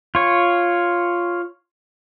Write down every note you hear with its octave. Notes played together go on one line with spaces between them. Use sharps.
F4 C#5